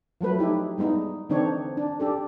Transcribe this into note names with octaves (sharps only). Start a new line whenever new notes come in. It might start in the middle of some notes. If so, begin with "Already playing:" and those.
F3 F#3 A3 B4
D#4 E4 G4
G3 G#3 B3 D#4 E4
D3 E3 C4 D4 D#4 C#5
D4
D4 G4 A4